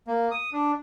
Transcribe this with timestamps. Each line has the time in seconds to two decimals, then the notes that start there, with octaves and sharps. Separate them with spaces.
0.07 A#3
0.31 D#6
0.53 D4